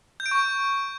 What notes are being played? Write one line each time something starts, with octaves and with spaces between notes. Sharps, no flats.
G6
D7
C#6